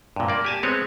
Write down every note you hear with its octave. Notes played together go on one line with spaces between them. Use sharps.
G2 A#2
A#3 D5
G4 G#5 A5
G#3 B3 C4 C#5